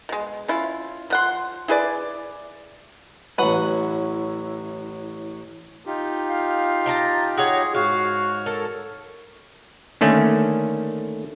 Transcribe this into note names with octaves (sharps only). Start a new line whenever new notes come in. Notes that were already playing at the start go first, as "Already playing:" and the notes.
B2 G#3
C#4 E4 F4
F3 F#5 C6
E4 G#4 B4 D5
A1 F#3 E4 B4 F#5
D#4 F4 G4
F5
G5 A5 A#5
F#4 G#4 C#5
G#2 F#4 C#5 F5 F6
A4 A#4
D3 D#3 A3 A#3 C#4